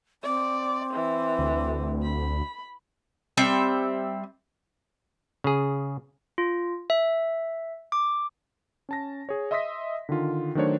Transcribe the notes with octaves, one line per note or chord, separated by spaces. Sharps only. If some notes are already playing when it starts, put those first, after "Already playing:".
C4 D5
E3
D2
B5
G3 C4 E5
C#3 G#4
F4
E5
D6
C#4 A5 A#6
G#4 C#5
D#5 E5 C6 D#6 A#6 B6
D3 D#3 F4
D#3 F#3 A3 D4 C5 C#5